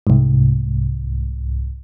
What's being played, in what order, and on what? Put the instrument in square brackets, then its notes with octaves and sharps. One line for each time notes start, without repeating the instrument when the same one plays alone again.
[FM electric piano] C2 G#2